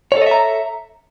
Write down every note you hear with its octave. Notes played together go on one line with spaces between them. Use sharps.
A4 C#5 D#5 E5 A#5